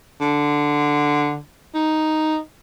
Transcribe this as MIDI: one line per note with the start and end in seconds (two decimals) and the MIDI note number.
0.21 1.39 50
1.74 2.37 63